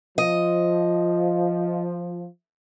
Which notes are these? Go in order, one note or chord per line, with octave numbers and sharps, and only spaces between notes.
F3 D#5